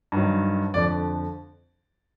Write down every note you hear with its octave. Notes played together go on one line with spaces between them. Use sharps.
G2 D#3 F#3
F2 D3 F3 D5